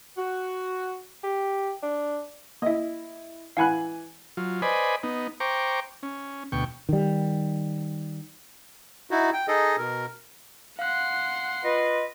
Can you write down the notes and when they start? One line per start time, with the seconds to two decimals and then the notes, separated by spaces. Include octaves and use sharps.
0.17 F#4
1.23 G4
1.83 D4
2.62 A#3 E4 D#5 E5
3.57 E3 F5 F#5 G#5 B5 F#6
4.37 F#3 F4
4.62 B4 C5 D5 D#5 G#5 B5
5.03 B3 D#4
5.40 C5 G5 A#5 C#6 D6
6.03 C#4
6.52 D2 B2 G5 C#6
6.89 D#3 G3
9.11 D#4 E4 F#4
9.33 G5
9.48 D#4 G#4 A4 D#5
9.78 B2 A#4
10.79 F5 F#5 C6 F#6
11.64 F4 B4 D#5